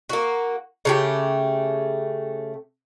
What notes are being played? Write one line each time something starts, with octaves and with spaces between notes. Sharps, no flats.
A#3 F#4
C#3 A3 G4